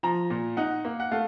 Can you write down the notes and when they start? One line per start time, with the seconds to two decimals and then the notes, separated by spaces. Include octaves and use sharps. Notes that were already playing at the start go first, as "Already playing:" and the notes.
0.03 F3 A#5
0.30 A#2
0.57 D#4 F#5
0.85 A#3
1.00 F#5
1.11 A3 F5